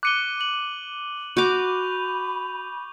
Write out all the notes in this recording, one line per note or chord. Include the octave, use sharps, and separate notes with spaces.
D6 F#6 C#7 D#7 G7
F#7
F#4 B5 C#6 D6 G6 F7